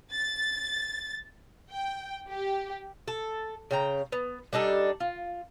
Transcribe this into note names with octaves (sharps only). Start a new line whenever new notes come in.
A6
G5
G4
A4
C#3 G5 A#5
B3
G3 D4 D#4 A4
F4